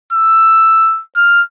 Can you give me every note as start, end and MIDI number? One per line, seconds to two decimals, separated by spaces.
0.13 1.01 88
1.16 1.42 89